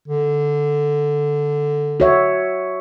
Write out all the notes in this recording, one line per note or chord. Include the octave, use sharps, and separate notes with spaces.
D3
F#4 C#5 E5